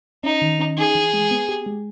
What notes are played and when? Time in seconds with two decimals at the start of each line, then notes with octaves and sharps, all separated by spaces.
0.24 C#4 D#4
0.42 D#3
0.59 C#4
0.77 D#4 G#4
0.95 E3
1.13 G#3
1.31 B3
1.49 G4
1.66 G#3